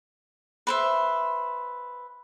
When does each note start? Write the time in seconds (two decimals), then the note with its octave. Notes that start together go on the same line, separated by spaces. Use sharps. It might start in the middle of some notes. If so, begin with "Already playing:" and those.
0.67 B4 C5 E5